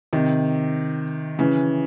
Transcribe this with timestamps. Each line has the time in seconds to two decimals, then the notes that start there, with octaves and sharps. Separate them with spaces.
0.13 C3 D#3
1.39 C#3 E3